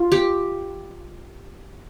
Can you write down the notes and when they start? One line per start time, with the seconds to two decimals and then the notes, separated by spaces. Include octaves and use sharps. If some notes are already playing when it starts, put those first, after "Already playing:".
Already playing: F4
0.12 G4